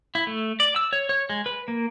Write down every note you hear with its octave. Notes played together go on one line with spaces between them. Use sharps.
E4
A3
D5
E6
C#5
C#5
G#3
B4
A#3